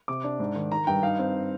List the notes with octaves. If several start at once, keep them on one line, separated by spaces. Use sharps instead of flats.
C3 D6
D4
G#2
D#3
D#3 A#5
G2 G5
D#4 F5
C4